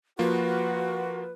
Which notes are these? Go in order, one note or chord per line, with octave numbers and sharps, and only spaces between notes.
F3 A#3 F4 F#4 B4